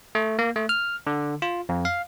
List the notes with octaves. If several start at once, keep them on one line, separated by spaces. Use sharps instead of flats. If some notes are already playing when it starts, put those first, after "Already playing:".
A3
A#3
A3
F6
D3
F4
F2
F5